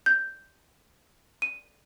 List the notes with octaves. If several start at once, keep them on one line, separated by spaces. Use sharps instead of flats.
G6
D#7